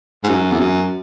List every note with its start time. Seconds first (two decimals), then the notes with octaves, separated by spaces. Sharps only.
0.24 G#2
0.29 F#2
0.52 E2
0.59 F#2